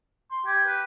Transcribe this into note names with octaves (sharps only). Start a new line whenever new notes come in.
C6
G4 G#5
B4